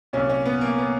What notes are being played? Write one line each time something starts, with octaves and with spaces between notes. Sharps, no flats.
C2 A#2 F#3 C#4
C#4
B3
A#3
B3